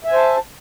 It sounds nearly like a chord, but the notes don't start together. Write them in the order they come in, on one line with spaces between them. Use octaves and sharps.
E5 G#5 C5 A5